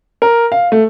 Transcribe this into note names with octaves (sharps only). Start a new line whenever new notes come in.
A#4
F5
A3